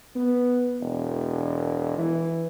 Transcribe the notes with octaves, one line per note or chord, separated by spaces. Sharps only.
B3
E1
E3